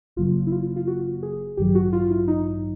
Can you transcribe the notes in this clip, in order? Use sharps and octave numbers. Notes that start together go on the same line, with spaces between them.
G1 F#2 C#3 F#3 A#3 F4
E4
F4
F4
F#4
G#4
A1 G2 D#3 F#3 G4
F#4
F4
E4
D#4